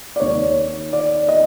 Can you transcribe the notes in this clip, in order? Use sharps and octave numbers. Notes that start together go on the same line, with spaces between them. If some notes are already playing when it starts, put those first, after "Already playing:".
D5
D#2 D#3 C#5
D5
D#5